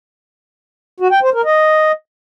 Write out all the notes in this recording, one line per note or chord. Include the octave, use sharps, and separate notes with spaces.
F#4
G5
C5
A#4
D#5